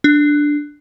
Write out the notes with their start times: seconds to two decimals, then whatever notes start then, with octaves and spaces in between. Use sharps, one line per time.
0.04 D4